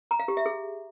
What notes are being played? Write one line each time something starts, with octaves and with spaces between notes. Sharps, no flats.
A#5
F5
G4
E5
G#4